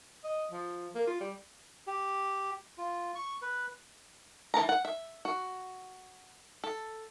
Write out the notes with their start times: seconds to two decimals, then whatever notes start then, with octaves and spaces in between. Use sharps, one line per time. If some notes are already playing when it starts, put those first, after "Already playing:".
0.24 D#5
0.52 F3
0.95 A#3
1.07 F4
1.20 G3
1.87 G4
2.78 F4
3.15 C#6
3.42 B4
4.54 E3 A#4 A5 A#5
4.69 F#5
4.85 E5
5.25 F#4
6.64 A4